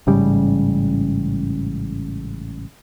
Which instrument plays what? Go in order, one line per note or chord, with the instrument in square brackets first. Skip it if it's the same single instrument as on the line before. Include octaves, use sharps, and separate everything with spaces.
[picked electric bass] A1 G#2 C#3 G3